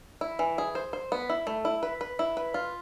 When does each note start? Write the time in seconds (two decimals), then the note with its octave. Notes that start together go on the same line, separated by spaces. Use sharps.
0.21 E4
0.39 E3
0.58 G#4
0.75 C5
0.93 C5
1.12 B3
1.29 E4
1.47 A3
1.65 E4
1.83 B4
2.01 B4
2.19 E4
2.37 B4
2.54 F4